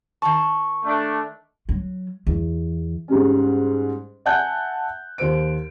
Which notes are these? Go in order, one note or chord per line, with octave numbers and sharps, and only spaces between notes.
D#3 A5 C#6
A3 D4
F#3
E2
G#2 G3 C#4
E5 F#5 G#5 A5 F#6 G6
D#2 C5 D7